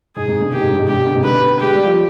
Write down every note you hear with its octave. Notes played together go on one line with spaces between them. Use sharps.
G#2 G#4
G#2 C3
B2 D3
C3 D#3 G4
G#2
G2
G#2
G2 B2 G4
B2 D3
G#2 C3
B2 D3 B4
G#3 G4
G3
F3